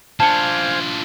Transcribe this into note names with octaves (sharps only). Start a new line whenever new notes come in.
D4 F4 C5 F5 G#5 A5 C#7